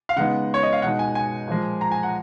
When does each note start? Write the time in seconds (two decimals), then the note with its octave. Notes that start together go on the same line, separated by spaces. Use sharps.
0.09 F5
0.16 C#3 G#3 B3 D#4 F#5
0.54 C#5
0.63 D#5
0.73 F5
0.82 B2 G#3 D#4 F#5
0.99 G#5
1.15 G#5
1.48 A#2 F3 G#3
1.81 A#5
1.92 G#5
2.03 F#5